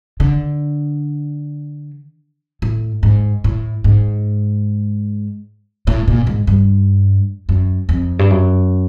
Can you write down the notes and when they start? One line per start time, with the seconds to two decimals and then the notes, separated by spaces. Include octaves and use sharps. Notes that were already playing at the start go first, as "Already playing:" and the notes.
0.20 D3
2.62 A2
3.03 G#2
3.44 A2
3.84 G#2
5.87 A2
6.08 A#2
6.27 G#2
6.47 G2
7.49 F#2
7.89 F2
8.19 G2
8.30 F#2